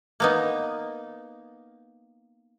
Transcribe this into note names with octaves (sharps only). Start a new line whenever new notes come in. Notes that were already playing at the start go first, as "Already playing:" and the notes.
A#3 B3 D#4